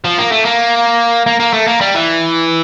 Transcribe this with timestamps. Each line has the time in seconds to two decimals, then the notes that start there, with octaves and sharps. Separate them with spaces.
0.05 F3
0.18 A#3
0.32 A3
0.45 A#3
1.26 A#3
1.40 A#3
1.53 A3
1.67 A#3
1.81 G3
1.95 E3